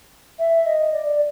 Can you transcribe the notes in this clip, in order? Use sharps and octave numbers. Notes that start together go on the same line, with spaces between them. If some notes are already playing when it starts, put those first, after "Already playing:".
E5
D#5
D5